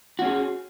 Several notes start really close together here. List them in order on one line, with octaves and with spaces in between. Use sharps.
F#4 C#4 G#4